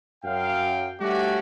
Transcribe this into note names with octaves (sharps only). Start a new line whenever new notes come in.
F#2 F5 G5
G3 A3 C#4 D4 F#4 G4